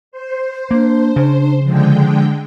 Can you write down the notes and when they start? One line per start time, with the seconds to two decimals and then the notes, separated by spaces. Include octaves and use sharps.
0.12 C5
0.71 A#3 D4
1.16 C#3
1.64 D3 F3 G#3 G5